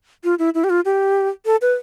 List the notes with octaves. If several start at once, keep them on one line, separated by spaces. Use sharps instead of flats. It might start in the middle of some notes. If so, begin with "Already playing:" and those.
F4
E4
E4
G4
F4
G4
A4
B4